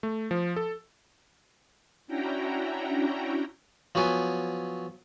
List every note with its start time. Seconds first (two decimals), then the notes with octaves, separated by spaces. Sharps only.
0.03 A3
0.31 F3
0.56 A4
2.07 C#4 D4 E4 F#4 G5 A#5
3.95 F3 F#3 B3 G#5